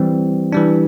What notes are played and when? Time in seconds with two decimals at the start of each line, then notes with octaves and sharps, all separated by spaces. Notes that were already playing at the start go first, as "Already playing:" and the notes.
Already playing: E3 G3 C4
0.52 E3 G3 D4